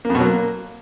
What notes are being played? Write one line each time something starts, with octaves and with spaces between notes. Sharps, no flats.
A#3
F2
B2
F#3
A#3